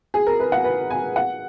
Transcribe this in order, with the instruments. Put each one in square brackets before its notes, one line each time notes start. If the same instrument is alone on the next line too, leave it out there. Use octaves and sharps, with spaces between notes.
[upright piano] G#4
A#4
B4
F#5
B4
G#5
F#5